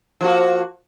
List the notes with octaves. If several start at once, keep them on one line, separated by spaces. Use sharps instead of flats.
F3 A#3 F#4